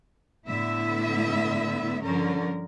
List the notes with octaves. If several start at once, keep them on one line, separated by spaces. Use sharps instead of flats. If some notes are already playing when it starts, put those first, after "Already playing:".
A2 D3 B3 E4 E5
G2 D3 F3 C#4 A#4